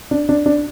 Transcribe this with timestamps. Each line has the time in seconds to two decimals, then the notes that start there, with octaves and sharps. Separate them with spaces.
0.11 D4
0.29 D4
0.46 D4